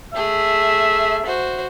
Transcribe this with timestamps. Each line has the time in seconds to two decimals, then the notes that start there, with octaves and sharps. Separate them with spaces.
0.14 A3 G#4 E5
1.26 F#4 C5